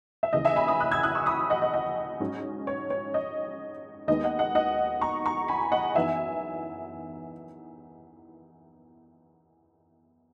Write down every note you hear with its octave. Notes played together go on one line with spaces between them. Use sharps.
E5
D#2 C#3 E3 D#5
E5 G#5
G#5 B5
B5 D#6
D#6 F#6
E6 G#6
D#6 F#6
C#6 E6
B5 D#6
D#5 F#5
D#5
D#5
G#2 F#3 C#4
C#5
C#5
D#5
D#2 D#3 G#3 B3 D#4 D#5
D#5 F#5
D#5 F#5
D#5 F#5
A#5 C#6
A#5 C#6
G#5 B5
D#5 F#5
F#2 E3 B3 D#4 E5 G#5